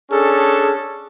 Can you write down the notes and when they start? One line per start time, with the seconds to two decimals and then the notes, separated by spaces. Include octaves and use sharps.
0.11 C#4 D4 G#4 A4